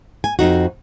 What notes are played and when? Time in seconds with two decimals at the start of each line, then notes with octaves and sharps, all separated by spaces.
0.24 G#5
0.39 F2 D#4 F#4